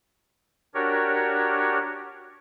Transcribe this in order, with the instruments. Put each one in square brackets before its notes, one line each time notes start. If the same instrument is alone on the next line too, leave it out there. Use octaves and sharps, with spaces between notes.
[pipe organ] D4 F#4 G4 A#4 C#5